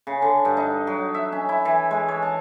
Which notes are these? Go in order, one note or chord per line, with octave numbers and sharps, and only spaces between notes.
C#3
D3
G2
D#4
F#3
E5
C#4
E4
E3
G#3
C#5
A5